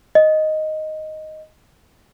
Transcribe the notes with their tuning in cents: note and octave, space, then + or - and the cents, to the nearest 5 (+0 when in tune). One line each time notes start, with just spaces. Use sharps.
D#5 +0